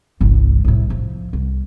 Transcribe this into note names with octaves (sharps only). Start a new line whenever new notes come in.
G1 C2
C2 A2
F3
C2